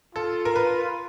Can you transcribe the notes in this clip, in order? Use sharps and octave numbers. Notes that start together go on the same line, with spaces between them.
F4 A4
A#4
B4